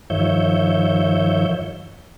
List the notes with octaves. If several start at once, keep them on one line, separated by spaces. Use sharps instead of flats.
G2 D#3 F3 C#5 E5 G6